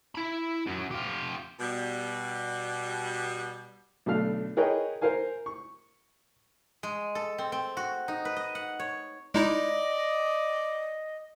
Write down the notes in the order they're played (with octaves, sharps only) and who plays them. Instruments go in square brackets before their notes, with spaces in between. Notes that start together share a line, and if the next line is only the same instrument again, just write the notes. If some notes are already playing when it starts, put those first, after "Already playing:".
[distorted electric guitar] E4 B5
F#2 F#3
F4 G4
[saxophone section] B2 G3
[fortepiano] B1 D3 A3 D4 F5 F6
G#4 A#4 B4 C#5 D#5 G5
A#4 C5 F5 G#5
C#6
[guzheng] G#3
A4
C4
C4
F#4
D#4
B4
D#5
F#5
C#5
[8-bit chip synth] G#3 D#4 E4 [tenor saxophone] D5 [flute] D#5